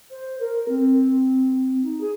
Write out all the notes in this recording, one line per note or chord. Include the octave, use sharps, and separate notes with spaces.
C5
A#4
C4
D#4
G#4